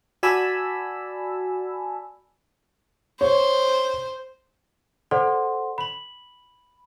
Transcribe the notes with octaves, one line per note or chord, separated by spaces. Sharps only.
F#4 D5 G#5 A5 B5 E6
C5 C#5
A4 C5 D5 F#5 C6
B5 F#7